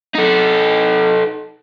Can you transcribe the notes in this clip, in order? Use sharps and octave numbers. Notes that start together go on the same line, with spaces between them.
D#4 A4